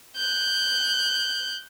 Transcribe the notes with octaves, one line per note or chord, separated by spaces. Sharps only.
F#6 G6